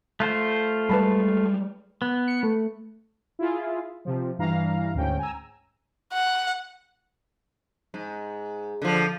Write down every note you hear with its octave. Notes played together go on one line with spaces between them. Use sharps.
A3 F4 C5
G3 G#3 B4 A5 B5
B3
C#7
A3
E4 F4 G#4
C3 F3
G2 E3 F5 A#5
D2 G#2 C#4 G5
G#5 A#5 E6
F#5
G#2
D3 F3